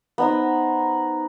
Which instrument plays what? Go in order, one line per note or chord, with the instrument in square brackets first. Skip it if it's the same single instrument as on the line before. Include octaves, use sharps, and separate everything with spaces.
[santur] B3 D#4 C5